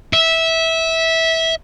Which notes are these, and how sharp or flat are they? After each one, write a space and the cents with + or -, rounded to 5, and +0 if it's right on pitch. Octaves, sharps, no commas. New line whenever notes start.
E5 -15